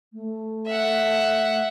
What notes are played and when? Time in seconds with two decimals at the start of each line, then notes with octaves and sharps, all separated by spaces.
0.13 A3
0.67 E5 F#5